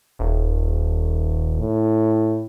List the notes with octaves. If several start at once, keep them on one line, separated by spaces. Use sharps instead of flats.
D#1
A2